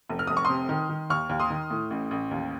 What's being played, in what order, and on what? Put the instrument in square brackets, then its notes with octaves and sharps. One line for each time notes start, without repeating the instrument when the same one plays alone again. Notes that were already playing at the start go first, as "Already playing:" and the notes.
[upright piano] F1
F6
F1 D#6
C#6
C3 C6 D#6
D#3
D#3
D#2 C#6 F6
D#2
C6 D#6
D#3
A2
A1
A1
D#2